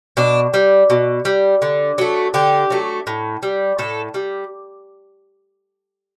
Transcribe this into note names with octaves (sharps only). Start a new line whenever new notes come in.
B2 D4
G3
B2
G3
D3
F#3 A3
D3 G4
F#3 A3
A2
G3
A2 A4
G3